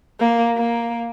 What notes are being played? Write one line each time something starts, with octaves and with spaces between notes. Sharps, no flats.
A#3
A#3